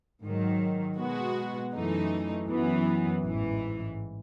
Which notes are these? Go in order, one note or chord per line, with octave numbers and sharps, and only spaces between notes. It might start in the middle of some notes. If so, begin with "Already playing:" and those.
G#2 D#3 F#3
B2 G#3 B3 F#4
F#2 E3 A3 D#4
F#2 E3 B3
A1 G#2 E3